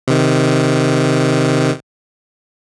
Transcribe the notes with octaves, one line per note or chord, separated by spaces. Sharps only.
C3 D#3